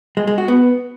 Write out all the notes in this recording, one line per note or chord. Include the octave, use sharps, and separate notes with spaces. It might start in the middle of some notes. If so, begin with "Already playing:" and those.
G#3
G#3
F#4
B3